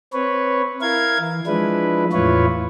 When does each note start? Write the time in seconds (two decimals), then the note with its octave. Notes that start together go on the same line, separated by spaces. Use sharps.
0.13 C4 B4 C#5
0.81 E4 A#4 F5 G#6
1.18 E3
1.47 F3 G#3 D4 E4 B4
2.12 E2 A2 E4 F4 B4 C#5